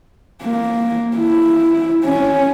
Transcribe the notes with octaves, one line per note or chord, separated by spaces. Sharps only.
A#3
E4
C#4